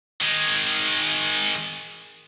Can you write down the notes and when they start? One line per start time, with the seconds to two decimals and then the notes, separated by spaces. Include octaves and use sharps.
0.22 D#3 G#3